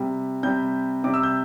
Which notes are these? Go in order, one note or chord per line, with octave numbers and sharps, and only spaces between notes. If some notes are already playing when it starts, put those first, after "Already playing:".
Already playing: C3 G3
C3 G3 G6
C3 G3 D6
E6
G6